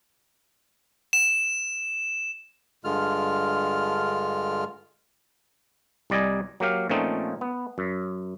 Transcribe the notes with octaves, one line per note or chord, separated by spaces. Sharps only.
E7
G2 D3 G#3 F4 F6
C2 G3 D5 D#5 G#5
F#3 A#3 G4 F5
A#2 F3 A3 C4 C#4 D#4
B3
F#2